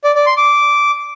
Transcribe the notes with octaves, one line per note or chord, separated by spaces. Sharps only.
D5
D5
C6
D6